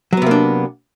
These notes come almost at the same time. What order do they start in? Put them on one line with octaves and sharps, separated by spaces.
F#3 B3 C3 A#3 D4